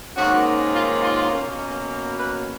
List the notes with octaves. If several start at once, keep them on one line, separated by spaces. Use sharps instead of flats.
G#2 D#3 A#3 C#4 F#4
F4
F4
B2 F#3 A#3 C#4
B4